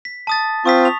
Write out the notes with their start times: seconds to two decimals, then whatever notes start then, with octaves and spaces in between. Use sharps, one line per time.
0.05 B6
0.27 A5 D#6 A6
0.65 C4 F4 C#6 D#6 B6
0.85 F7